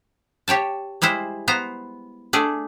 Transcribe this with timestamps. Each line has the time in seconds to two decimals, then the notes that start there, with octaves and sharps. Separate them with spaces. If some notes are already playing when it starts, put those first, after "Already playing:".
0.48 G4 C#5 G5 A5
1.02 G3 G#3 E4 C5
1.48 B3 C5 A#5
2.33 A3 D4 G#4